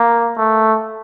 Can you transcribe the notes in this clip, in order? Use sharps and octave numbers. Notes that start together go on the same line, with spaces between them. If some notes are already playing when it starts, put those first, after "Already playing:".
Already playing: A#3
A3